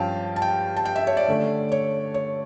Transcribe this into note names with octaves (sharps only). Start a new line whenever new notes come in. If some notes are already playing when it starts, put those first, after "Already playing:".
Already playing: G2 F3 C#4 F5 G5 A5
A5
G5
A5
G5
E5
C#5
D5
D3 A3 C#4
C#5
C#5